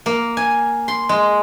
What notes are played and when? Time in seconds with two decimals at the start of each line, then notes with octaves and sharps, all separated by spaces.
0.06 A#3
0.37 G#5
0.88 C6
1.09 G#3